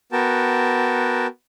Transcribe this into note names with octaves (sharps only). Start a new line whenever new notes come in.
B3 F#4 A#4 G5 A5